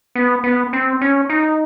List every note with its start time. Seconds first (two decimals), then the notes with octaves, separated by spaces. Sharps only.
0.15 B3
0.44 B3
0.73 C4
1.01 C#4
1.29 D#4